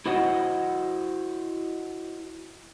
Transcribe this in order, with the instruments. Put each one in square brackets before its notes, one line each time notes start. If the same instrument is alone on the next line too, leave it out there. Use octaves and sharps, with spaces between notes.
[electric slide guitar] E4 F#4 C5 D#5 F#5